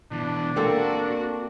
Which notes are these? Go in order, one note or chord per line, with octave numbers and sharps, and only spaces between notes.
B2 E3 D4
A#3 C4 F#4 A4